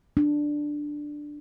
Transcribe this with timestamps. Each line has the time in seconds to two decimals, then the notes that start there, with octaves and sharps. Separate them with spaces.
0.17 D4